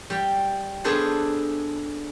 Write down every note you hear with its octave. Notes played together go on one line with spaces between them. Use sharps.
G3 G5
B3 D4 G#4 A4 C5